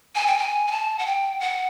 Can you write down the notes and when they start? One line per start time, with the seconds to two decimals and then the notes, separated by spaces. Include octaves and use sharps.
0.15 G#5
0.27 G5
0.39 G#5
0.67 G#5
0.72 A5
0.99 F#5
1.06 G5
1.40 F#5